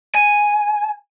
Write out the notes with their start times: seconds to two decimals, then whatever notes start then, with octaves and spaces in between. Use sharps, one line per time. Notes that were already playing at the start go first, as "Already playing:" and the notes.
0.15 G#5